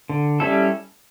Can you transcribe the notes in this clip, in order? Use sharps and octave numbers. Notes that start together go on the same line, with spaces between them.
D3
G3 C#4 E4 A4